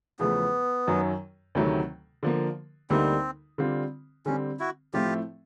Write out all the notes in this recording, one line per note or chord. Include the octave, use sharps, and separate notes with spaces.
E2 C#3 F3 A3 B3
F#2 D#3 F#3
D2 C3 D#3 F#3 A3
D3 F3 A#3
D2 D3 G3 A#3 C4 D#4
D3 G3 C4 F4
D3 G3 C4 C#4
E4 F#4
A2 F3 A3 C4 E4 F4 G4